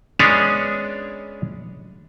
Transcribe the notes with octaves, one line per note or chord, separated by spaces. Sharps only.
G#3 B3 C#4 D4 G#4 C#5